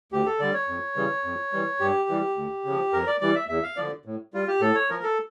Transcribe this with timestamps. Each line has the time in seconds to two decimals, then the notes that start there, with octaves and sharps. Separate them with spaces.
0.12 D2 G4
0.26 A4
0.40 D3 G3 D5
0.54 C#5
0.68 F2
0.96 C#3 E3 G3
1.24 F2
1.53 E3 G3
1.80 G2 G4
2.09 E3 G3
2.36 D2
2.65 C#3 F3
2.93 F2 A#4
3.07 D5
3.20 E3 G3 D5
3.35 E5
3.48 E2 E5
3.63 F5
3.77 D3 F3 D5
4.05 A2
4.33 G3 F4
4.48 G4
4.61 A2 A4
4.75 C#5
4.89 F3 A#4
5.03 A4